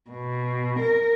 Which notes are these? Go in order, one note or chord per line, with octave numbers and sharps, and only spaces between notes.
B2
A#4